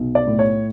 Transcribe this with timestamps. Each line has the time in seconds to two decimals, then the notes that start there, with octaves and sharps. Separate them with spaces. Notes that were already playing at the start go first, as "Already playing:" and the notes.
Already playing: B1
0.15 D5
0.27 A2
0.39 C#5